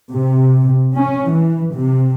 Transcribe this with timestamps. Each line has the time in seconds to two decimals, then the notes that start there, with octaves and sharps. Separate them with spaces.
0.10 C3
0.95 C#4
1.29 E3
1.74 C3